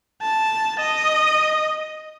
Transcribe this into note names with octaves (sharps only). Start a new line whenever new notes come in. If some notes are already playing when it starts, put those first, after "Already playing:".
A5
D#5